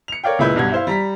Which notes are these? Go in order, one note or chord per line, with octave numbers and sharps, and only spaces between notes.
C#7 F7
A#4 C#5 D5 F5 G5
C#2 A#2 G#3 E4 B4 G6
B1 G2 F#4 G#6
E4 C5 F5
G3 A#5 B6